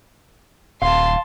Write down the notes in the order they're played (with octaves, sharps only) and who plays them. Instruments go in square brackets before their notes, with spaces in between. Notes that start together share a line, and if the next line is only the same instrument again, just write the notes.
[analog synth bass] D#1 [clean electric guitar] F5 [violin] A5 C6